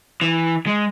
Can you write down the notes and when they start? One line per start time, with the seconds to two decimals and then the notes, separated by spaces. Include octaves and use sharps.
0.21 E3
0.66 G#3